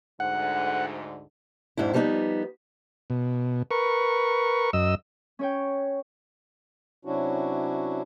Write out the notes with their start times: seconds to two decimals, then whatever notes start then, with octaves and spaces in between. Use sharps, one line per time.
0.20 D2 G#2 D3 F#5
1.77 F2 G#2 D4 E4
1.93 F3 G3 B3 D4 D#4
3.10 B2
3.71 A#4 B4 C#6
4.73 F#2 D#5 E6
5.39 C#4 C#5 G5
7.05 C3 F#3 C#4 D4 E4 F#4